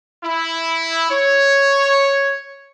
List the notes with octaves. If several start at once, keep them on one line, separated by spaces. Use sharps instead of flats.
E4
C#5